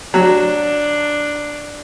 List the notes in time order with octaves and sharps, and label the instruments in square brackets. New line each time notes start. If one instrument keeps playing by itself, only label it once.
[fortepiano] F#3 [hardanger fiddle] D4